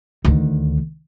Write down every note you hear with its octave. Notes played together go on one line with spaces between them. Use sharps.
D2 D#3